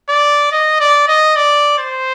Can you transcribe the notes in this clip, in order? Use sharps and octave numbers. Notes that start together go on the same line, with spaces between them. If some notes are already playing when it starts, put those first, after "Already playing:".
D5
D#5
D5
D#5
D5
C5